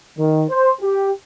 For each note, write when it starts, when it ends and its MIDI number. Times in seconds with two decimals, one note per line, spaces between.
0.18 0.43 51
0.50 0.72 72
0.81 1.11 67